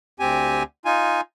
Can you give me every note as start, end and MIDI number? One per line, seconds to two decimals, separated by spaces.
0.20 0.63 38
0.20 0.63 60
0.20 0.63 67
0.20 0.63 80
0.85 1.21 63
0.85 1.21 65
0.85 1.21 80